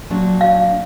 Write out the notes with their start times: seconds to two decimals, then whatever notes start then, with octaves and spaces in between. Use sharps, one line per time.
0.10 A#2 F#3 D4
0.41 F5